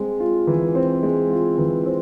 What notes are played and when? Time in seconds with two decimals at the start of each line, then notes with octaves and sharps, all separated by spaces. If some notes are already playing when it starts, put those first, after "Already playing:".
Already playing: G#3 C4
0.20 F4
0.47 E3
0.75 C4
1.03 G#3
1.30 F4
1.58 E3
1.86 C4